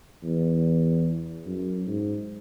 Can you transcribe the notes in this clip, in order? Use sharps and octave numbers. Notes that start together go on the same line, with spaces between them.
E2
F#2
G#2